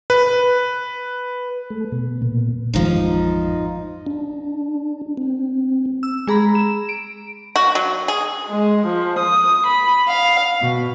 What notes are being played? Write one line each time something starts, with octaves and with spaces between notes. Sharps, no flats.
B4
A3
B2
A#2
A1 F2 G#2 F3 D#4
D4
C4
E6
G#3 G#4 A#5 B5
E7
D7
F#4
F#3
G#4
G#3
F3
D#6
B5
F5
B2